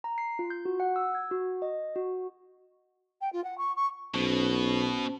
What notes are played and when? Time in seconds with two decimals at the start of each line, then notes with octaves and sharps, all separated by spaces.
0.04 A#5
0.18 C7
0.39 F4
0.50 G6
0.65 F#4
0.80 F#5
0.96 E6
1.15 G#6
1.31 F#4
1.62 D#5
1.96 F#4
3.21 G5
3.33 F4
3.44 F#5
3.58 C#6
3.76 C#6
4.14 B1 B2 C#4 C5 A5